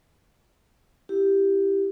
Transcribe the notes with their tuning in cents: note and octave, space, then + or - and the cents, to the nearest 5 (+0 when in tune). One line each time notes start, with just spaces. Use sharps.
E4 +0 G4 +0